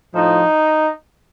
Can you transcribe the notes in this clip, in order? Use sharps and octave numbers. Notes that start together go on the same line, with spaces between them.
A2 F3 D#4